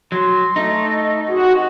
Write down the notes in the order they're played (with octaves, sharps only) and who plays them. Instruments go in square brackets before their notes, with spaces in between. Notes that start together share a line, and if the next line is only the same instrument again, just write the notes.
[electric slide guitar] F#3 [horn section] C6
[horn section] A3 [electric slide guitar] D#4
[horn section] F#2 C3 G#4 [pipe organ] F#4